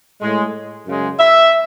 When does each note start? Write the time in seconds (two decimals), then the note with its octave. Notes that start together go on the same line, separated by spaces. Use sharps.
0.22 A2 G#3
0.86 F#2 C#3 G#3
1.19 E5